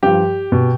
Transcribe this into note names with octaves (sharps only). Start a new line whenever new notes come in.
G2 F3 G4
B2